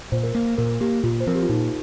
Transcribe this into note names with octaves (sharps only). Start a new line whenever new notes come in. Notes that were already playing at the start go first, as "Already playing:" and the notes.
A#2 C5
A#4
A#3
A#2 A#4
A#3 G4
A#2 F4
C5
F3 C4 A#4
G4
F4
A#2 D#4